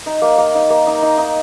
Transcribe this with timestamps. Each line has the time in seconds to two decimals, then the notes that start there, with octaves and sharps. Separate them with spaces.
0.06 D#4
0.22 A#3
0.38 A#3
0.55 D#4
0.70 A#3
0.87 D#4
1.02 D#4
1.18 D#4